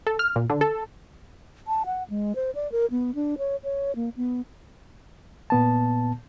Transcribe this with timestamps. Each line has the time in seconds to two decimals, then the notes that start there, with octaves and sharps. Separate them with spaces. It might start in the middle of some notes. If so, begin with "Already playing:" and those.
0.07 A4
0.19 F6
0.36 A#2
0.50 D3
0.61 A4
1.67 A5
1.86 F#5
2.10 G#3
2.35 C5
2.55 D5
2.72 A#4
2.91 B3
3.15 D4
3.38 C#5
3.64 C#5
3.96 A#3
4.17 B3
5.50 A#2 B3 A5